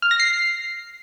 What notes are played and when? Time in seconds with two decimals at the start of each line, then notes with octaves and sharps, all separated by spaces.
0.02 F6
0.11 A#6
0.20 C7